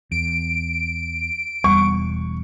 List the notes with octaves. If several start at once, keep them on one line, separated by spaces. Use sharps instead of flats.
E2 D7
E1 E2 G3 C#6